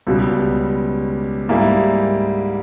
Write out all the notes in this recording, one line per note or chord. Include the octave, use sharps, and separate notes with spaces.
C#2 B2 G3
G#2 G3 A#3 E4 G#4